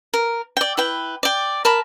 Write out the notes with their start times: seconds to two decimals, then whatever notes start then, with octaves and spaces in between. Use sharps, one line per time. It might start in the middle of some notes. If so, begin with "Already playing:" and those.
0.14 A#4
0.57 D5 G5
0.77 E4 B4 G5
1.23 D5 G5
1.65 A#4 A5 B5